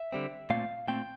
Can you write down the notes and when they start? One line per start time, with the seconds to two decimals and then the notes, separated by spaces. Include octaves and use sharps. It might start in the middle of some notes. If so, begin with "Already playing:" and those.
Already playing: E5
0.12 D3 G3 C4
0.50 A#2 A3 C4 F5
0.88 A#2 A3 C4 G5